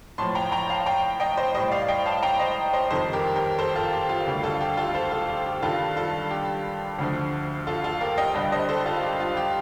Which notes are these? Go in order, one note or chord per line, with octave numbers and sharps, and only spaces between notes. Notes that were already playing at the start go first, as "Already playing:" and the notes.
A2 F3 A5 C6
G5 A#5
G5 A#5
F5 A5
G5 A#5
D#5 G5
C5 D#5
A2 G3 C5 D#5
D5 F5
D#5 G5
F5 A5
G5 A#5
C5 D#5
C5 D#5
F2 D#3 G3 A4 C5
G4 A#4
G4 A#4
A4 C5
F4 A4
G4
F4
D2 D3 G3 G4
F4 A4
G4
F4 A4
A4 C5
F4 A4
G4
G4
G2 D#3 G3 F4 A4
F4 A4
G4
D2 D3 F3
F4 A4
F4 A4
G4 A#4
D#5 G5
G2 D3 G3 D#5 G5
C5 D#5
A4 C5
F4 A4
G4
F4
G4